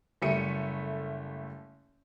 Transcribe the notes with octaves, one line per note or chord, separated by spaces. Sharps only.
F#1 G3 A3 E5 C#7 D#7